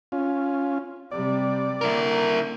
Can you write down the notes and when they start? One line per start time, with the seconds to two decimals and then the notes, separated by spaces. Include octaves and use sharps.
0.12 C#4 F4
1.11 C3 G3 D5
1.81 D3 A#3 E4 A#4